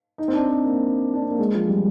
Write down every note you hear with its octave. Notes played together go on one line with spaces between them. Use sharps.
D#4
C4
D4
C4
A#3
D4
C4
A#3
G#3
F3
G3